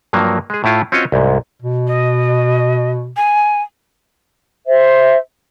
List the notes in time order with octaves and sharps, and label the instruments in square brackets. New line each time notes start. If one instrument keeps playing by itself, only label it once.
[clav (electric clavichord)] G2 F3 F#3 A#3
G#3 G#4
A2 A3 E4 F4
C4 C#4 F4 F#4 C#5 D#5
C2 G#2
[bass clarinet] B2
[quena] D#5
G#5
[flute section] C5 E5